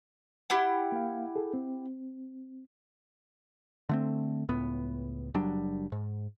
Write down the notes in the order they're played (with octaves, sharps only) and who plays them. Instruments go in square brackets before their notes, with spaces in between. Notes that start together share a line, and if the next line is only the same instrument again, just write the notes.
[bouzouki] E4 G4 F#5
[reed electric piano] A#3 F5
G#4 A4
C4
[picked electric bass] D3 A3 C4
C#2 A2 B3
F#1 F#3 G3 D4
G#2